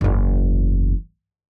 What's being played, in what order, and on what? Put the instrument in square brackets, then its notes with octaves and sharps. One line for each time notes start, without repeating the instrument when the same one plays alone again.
[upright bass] F#1 E2